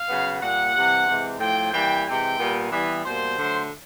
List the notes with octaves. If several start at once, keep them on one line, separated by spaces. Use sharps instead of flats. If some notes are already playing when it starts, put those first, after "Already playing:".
Already playing: F5
C#3 F#3 B3
A#2 G3 A#3 F#5
C3 E3 G3
C3 E3 G#3
A2 F3 A3 C4 G5
E3 G3 A#3 G5
C3 E3 G#3 C4 G5
A#2 G3 B3
E3 G3 B3
B2 G3 A#3 C5
D3 F#3 A3